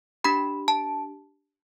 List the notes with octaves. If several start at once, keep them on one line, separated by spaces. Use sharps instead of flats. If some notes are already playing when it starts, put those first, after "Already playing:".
D4 G4 B5
A5